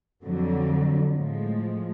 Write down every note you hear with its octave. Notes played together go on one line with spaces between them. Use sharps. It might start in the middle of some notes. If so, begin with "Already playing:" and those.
F2 D3 F#3
A2 F3 G#3